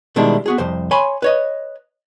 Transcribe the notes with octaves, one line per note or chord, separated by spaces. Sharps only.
B2 D#3 G3 G#3 D4 E4
B3 F#4 G#4
C2 F2 C5
C#5 G#5 B5 C6
B4 C#5 D#5